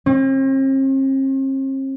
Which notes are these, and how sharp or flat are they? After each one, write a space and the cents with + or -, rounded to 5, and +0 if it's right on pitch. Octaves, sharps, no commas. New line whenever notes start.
C4 +45